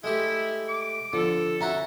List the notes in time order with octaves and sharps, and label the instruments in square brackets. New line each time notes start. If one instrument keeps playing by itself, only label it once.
[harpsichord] G#3 A3 G4 [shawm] E4
[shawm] D6
[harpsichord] D3 [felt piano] F3 F4 [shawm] A4
[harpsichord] C#4 E4 F#4 [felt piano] A#5